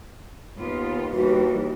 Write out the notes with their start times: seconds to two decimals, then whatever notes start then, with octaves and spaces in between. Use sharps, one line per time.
0.58 D#2 B3 F4
1.12 D#2 E3 G3 F#4